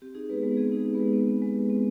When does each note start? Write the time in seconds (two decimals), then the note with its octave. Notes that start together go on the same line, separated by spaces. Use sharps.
0.02 C4 G4
0.15 D#4 G#4
0.30 G#3 B3 B4
0.43 G#3 B3 B4
0.57 C4 G#4
0.72 D#4 G#4
0.85 G#3
0.94 B3 B4
1.00 G#3
1.13 C4
1.28 D#4
1.42 G#3
1.56 G#3
1.70 C4